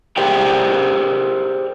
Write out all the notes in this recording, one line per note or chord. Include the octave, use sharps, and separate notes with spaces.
G4 G#4 A#4 C5 D5 G5